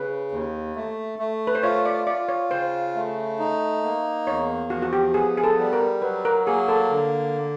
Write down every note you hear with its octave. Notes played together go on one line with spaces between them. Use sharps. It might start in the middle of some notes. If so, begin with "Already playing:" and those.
Already playing: C#3 B4
D#2
A3
A3
B4
C5
F4 C#5
D5
F4 D5
C#5
C#3 C5
A3
D#4
A#3
E2 C#5
F3 F#4
F#4
G4
B3 G#4
G#4
A4
G3
A#4
F#3 B4
A#4
A#3 G#4
A4
D3